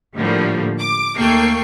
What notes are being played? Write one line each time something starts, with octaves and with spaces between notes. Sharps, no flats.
A2 D3 F3 G3 A3 A#3
D6
D#2 A3 A#3 G5 C#6 C7